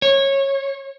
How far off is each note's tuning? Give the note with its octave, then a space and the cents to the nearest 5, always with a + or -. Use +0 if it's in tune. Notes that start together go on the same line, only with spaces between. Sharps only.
C#5 -20